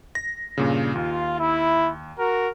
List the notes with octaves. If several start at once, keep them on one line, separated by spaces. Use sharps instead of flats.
A#6
G2 A#2 C#3
D#2 F4
E4
F#4 A#4